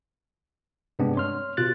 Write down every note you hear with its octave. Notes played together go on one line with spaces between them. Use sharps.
G2 C3 G#3 B3 C4 D4
C#5 C6 F6
B2 F4 G4 F#6 A6